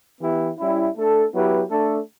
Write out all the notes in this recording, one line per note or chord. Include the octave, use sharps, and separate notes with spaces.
E3 B3 E4 G4 B4
G3 C#4 E4
A3 D4 A4
F#3 B3 E4 G4 B4
A3 D4 A4